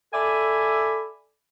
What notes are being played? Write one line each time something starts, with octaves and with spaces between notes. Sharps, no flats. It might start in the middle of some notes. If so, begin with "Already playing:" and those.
A4 D5 E5 G#5 B5